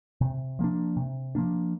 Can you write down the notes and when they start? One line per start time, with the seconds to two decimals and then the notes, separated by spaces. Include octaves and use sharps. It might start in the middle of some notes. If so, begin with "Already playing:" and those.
0.21 C3
0.59 F3 A#3 D4
0.97 C3
1.35 F3 A#3 D4